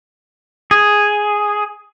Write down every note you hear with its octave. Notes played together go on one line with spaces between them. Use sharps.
G#4